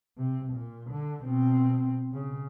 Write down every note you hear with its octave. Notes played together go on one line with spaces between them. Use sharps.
C3
A#2
D3
B2 C4
C#3